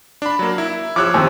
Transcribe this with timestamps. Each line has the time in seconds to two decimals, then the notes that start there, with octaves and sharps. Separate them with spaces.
0.22 D4 B5
0.39 F#3 A#3
0.58 E4
0.96 F3 C#5 D6 E6 F#6
1.14 D#2 A2 C4